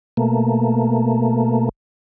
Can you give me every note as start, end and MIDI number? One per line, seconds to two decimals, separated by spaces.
0.17 1.69 47
0.17 1.69 57
0.17 1.69 58